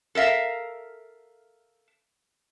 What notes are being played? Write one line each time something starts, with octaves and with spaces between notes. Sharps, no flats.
A4 A#4 E5 F5